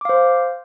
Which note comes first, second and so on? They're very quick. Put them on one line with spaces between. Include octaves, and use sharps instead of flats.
D6 F5 C5